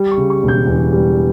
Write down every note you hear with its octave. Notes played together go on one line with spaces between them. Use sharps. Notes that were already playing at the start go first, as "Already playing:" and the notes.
Already playing: G3
C#6
C#3
C#6
E1
G6
E2
G3